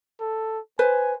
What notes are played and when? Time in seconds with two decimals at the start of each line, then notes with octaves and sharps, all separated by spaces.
0.21 A4
0.79 B4 C5 G#5